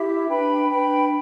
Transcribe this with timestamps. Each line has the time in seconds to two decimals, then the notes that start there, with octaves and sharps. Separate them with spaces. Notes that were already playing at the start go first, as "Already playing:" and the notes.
Already playing: E4 G4 E5
0.26 D4 B4 G5 B5
0.68 D4 B4 G5 B5